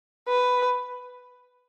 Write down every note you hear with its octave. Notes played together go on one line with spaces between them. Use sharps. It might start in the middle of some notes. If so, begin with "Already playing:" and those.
B4